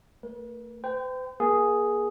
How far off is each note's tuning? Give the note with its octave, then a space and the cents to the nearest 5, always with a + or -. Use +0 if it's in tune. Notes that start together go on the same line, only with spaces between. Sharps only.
A3 +35 B4 -45
C5 -45 G5 +0
A#3 +30 G#4 +0